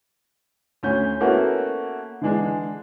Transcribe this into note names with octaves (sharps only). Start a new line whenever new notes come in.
D2 C#4 G6
A#3 B3 C#4 E4 F#4 A4
D3 E3 G#3 D4